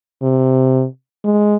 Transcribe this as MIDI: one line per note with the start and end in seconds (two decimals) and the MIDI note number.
0.22 0.85 48
1.25 1.56 56